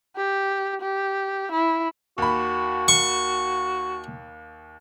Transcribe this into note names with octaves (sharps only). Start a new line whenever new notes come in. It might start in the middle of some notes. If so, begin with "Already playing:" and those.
G4
G4
E4
D#2 F#4 B5
C#6